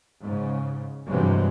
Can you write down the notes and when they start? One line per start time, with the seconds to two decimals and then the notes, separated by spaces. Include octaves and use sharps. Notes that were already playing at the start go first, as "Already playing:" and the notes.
0.21 G#2 C#3
1.09 G2 C3 E3 F#3 G#3